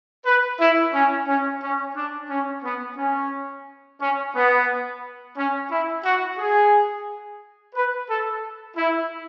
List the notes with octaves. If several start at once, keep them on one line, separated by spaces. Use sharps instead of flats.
B4
E4
C#4
C#4
C#4
D4
C#4
B3
C#4
C#4
B3
C#4
E4
F#4
G#4
B4
A4
E4